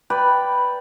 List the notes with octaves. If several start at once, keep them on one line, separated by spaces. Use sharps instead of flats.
B4 D5 G5 B5